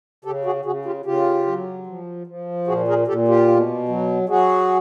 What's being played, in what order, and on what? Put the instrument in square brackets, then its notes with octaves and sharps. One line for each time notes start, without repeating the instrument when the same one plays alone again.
[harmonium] C#3 G4 A4
F#4 G#4
C#3 F#4 G#4
F4 G4
C#3 F4 G4
F#3
F3
F3
A#2 F#4 G#4
G#4 A#4
A#2 G4 A4
F4 G4
B2
F#3
F#3 F#4 G#4